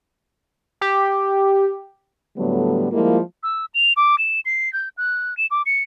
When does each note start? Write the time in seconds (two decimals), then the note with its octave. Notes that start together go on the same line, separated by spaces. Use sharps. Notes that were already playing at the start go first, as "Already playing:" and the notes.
0.81 G4
2.37 A2 D3 F#3 G3 A3 B3
2.92 F3 G3 G#3 A#3 E4 F4
3.43 E6
3.74 F7
3.97 D6
4.18 E7
4.45 C7
4.73 G6
4.97 F#6
5.37 E7
5.51 D6
5.66 C#7